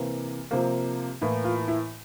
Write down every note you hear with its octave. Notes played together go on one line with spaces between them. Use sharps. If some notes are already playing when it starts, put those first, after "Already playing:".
Already playing: C3 E3 A#3
C3 F3 A#3
A2 E3 A#3
F4
E4